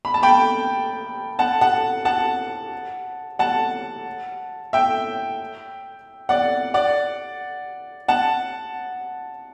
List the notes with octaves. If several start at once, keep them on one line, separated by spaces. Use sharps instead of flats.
B5
A5
G5 B5
F#5 A5
F#5 A5
F#5 A5
F#5 A5
E5 G5
D5 F#5
D5 F#5
F#5 A5